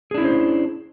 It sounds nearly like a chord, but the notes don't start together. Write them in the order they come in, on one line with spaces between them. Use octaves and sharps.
G#4 D4 E4 C#4 C5